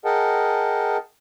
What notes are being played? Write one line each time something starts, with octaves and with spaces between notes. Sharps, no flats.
G#4 A#4 D#5 F#5 G5 A5